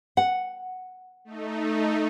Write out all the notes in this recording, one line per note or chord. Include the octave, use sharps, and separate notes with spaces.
F#5
A3 D#4